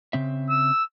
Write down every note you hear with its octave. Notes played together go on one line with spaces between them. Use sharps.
C#3 C4 E5
E6